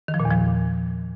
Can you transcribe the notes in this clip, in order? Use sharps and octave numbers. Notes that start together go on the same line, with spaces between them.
D#3
F3
A#2
E2
F3